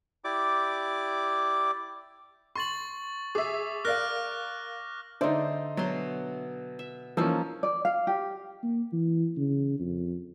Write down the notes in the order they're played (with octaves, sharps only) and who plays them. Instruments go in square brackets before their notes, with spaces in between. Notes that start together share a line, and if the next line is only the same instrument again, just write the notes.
[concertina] E4 G4 D5 D6
[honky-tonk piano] C6 [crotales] C#6 A6 F#7
[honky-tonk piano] G#4 E5 [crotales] D6
[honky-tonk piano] A#4 D5 F5 [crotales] F6 F#6 A#6
[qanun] D3 D5 [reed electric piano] D4 E5 [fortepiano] D#4 C5
[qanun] B2 C6 [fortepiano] F#3
[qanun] E5
[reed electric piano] E3 E6 [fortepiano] F3 C#4 [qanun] A#3 D#4
[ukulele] D5
F5
G4
[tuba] A#3
E3
C#3
F2